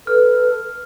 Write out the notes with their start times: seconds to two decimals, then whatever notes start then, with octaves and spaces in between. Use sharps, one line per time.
0.07 A4 B4 F6